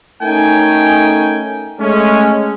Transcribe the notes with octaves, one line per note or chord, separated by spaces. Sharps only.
A3 C#4 D#4 A#4 G5 G#5
G#3 A3 C#4